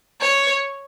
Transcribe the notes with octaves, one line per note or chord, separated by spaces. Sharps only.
C#5